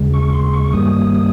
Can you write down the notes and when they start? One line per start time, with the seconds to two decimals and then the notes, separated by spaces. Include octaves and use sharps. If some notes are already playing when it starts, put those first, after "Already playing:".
Already playing: D#2 C#3 G#3
0.14 C#6
0.33 C6
0.53 C#6
0.73 G2 D#3 G3 A#3 D#6
1.14 D#6